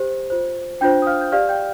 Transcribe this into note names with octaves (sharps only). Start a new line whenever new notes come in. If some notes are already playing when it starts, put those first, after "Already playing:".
Already playing: G4 C5
F4 C5
D4 F4 C5 G5 G6
D#6
F5 F6
G6
G4 D5 F5 F6
G5 G6